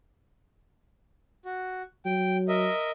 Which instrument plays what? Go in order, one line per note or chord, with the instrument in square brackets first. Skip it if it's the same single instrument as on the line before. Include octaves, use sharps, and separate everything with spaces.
[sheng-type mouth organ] F#4
[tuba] F#3 [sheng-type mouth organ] G5
[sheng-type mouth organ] A#4 D#5 E5